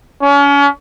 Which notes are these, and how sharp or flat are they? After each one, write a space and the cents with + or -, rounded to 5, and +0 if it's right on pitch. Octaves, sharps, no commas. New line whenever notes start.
C#4 +35